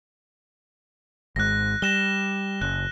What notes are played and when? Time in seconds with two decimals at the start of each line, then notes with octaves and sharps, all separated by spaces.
1.36 G#1 G#2 F#6 A#6
1.82 G3 A#6 E7 G7
2.61 F#1 F#6